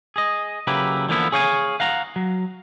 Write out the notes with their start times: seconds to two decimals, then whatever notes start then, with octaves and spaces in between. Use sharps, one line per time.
0.16 G#4 D#5
0.67 C#3 F#3 A#3 E4 G4 B4
1.09 D3 E3 F3 A#3 B3 E4
1.32 G#4 C#5 F5 G5 G#5
1.80 F5 F#5 A#5
2.16 F#3